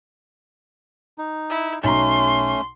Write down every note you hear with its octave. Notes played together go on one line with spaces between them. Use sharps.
D#4
E4
B1 A3 C#4 A#5 C6